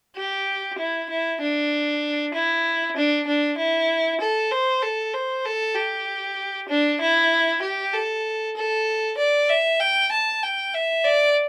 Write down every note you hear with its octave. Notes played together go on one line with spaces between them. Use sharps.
G4
E4
E4
D4
E4
D4
D4
E4
A4
C5
A4
C5
A4
G4
D4
E4
G4
A4
A4
D5
E5
G5
A5
G5
E5
D5